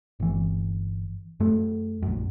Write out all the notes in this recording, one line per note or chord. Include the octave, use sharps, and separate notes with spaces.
G1 E3
F#2 A3
A#1 F#2